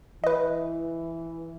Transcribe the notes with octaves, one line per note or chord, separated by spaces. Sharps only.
E3 B4 D#5